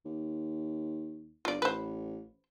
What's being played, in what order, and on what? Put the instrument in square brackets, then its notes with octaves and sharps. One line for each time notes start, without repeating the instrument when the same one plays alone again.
[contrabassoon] D#2
[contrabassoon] G1 [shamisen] F4 D5
[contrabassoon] A1 [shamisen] B4 C5